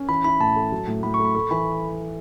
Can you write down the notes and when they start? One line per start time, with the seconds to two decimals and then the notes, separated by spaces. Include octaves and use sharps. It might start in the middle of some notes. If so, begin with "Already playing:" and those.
Already playing: C#4
0.09 E3 B5
0.24 E4 B5
0.40 A2 A5
0.56 A3
0.72 F#3
0.87 A2
1.03 A2 B5
1.14 C#6
1.19 A3
1.25 B5
1.35 A3 C#6
1.51 E3 B5